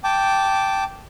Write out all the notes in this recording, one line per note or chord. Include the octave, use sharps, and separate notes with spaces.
G5 A5 D6